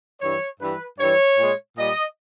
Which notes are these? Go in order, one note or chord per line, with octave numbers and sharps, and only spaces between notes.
G2 E3 G3 C#5
G2 E3 G3 B4
G2 E3 G3 C#5
A#2 G#3
A#2 G3 D#5